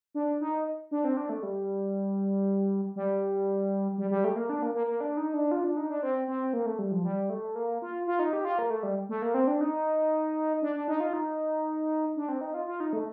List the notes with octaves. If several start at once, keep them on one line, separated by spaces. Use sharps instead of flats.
D4
D#4
D4
C4
D4
A3
G3
G3
G3
G3
A3
A#3
D4
A#3
A#3
A#3
D4
D#4
D4
F4
D4
D#4
D4
C4
C4
A#3
A3
G3
F3
G3
A3
A#3
F4
F4
D#4
G4
F4
A#3
A3
G3
A3
A#3
C4
D4
D#4
D4
D4
D#4
F4
D#4
D4
C4
D#4
F4
F4
D#4
A3